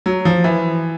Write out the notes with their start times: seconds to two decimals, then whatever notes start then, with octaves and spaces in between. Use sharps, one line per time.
0.06 F#3
0.25 F3
0.44 E3